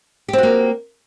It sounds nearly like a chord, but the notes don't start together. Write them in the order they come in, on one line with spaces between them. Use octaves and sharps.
G4 C4 F#4 A#3